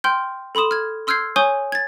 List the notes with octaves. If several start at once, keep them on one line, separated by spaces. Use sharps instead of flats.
G5 C6 F6 G6
A4 B5 C6 D#6 E7
F6 G#6
C6 E6 F6 G6 G#6 C7
C#5 G#5 C#6 D#6 G6 G7
G#6 A6